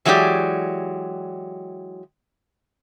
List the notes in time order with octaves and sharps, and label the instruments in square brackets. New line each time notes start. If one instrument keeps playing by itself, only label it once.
[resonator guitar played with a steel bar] E3 F#3 G#3 D#4 G4 D5